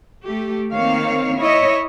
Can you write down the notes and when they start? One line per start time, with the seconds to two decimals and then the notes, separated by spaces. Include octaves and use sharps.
0.25 A3 G4
0.73 D#3 A#3 C4 C#5 F5
1.40 E4 C#5 D#5 E5